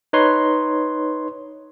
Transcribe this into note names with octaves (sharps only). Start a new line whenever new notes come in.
D#4 B4 C#5 C6